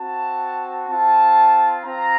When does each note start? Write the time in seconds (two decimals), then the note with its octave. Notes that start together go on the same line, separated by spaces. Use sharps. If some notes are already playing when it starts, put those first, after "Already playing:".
Already playing: C4 F#4 A5
0.89 C4 F4 A5
1.84 C4 F4 A#5